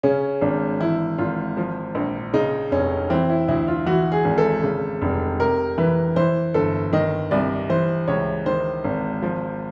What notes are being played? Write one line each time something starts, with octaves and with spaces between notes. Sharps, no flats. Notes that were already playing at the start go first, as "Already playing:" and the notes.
C#3 C#4
G#1 D4
E3 E4
G#1 F4
F3
A#1
C#3 D#4
F1 C#4
E3 C4
E4
D2 E4
F4
E3 F#4
G#4
G#1
A4
C#3
F1
C3 A#4
E3 B4
E3 C5
G1 A4
D#3 D#5
C2 D5
E3 C5
C#2 C#5
D#3 C5
G#1
F3